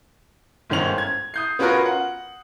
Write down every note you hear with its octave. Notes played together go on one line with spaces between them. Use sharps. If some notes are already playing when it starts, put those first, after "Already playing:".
G1 G#2 D#3 C#4 C5 F7
G#6
D#6 G6 C7
B3 C#4 F4 F#4 A#4 B4
F#5